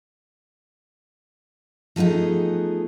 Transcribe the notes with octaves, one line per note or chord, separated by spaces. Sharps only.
F3 A3 B3 D#4 G#4